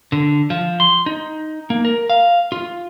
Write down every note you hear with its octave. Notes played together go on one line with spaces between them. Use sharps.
D3
F3
C6
D#4
A#3
A#4
F5
F4